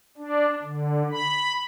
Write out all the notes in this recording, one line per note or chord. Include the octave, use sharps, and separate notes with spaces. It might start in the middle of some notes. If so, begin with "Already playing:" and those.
D4
D3
B5